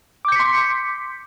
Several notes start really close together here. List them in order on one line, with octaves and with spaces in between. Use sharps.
D6 G6 C#7 B6 C6